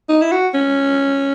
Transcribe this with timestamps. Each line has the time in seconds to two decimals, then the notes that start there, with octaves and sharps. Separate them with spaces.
0.09 D#4
0.21 E4
0.32 F#4
0.54 C#4